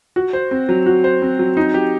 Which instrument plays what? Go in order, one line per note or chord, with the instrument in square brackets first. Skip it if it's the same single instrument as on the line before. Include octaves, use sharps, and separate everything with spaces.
[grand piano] F#4
C5
C4
F#3
F#4
C5
C4
F#3
D#4
G4